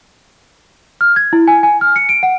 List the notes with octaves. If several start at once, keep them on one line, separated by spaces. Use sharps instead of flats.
F6
G#6
E4
G#5
G#5
F6
C#7
D7
F#5